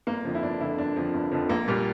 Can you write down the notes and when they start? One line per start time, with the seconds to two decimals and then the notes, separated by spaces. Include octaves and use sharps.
0.07 G1 A#3
0.25 F2 D3 F3
0.35 E4
0.43 G1 D4
0.60 F2 D3 F3 E4
0.78 G1 D4
0.96 F2 D3 F3
1.14 G1
1.32 F2 D3 F3
1.49 A#1 A#3
1.68 A#2 G3